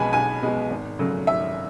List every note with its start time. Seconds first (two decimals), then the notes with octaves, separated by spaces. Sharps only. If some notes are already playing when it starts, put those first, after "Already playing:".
Already playing: B1 B2 G#3 B3 G#5 B5
0.13 B1 G#5
0.42 B2 G#3 B3
0.70 G#1
0.99 F#2 C#3 F#3 A3
1.27 G#1 E5